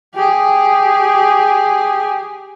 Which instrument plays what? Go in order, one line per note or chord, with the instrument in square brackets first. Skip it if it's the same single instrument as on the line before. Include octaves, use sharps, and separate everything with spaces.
[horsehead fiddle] G4 G#4